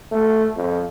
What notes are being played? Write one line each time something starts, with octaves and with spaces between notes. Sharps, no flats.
A3
F2